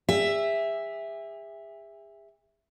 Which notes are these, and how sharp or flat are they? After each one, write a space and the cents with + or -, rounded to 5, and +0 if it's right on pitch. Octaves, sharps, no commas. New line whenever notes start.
G#4 -40 E5 +0